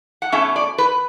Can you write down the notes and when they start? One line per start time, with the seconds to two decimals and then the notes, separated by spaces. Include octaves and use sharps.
0.22 F#5
0.32 B2 A3 C#4 E5
0.56 D5
0.78 B4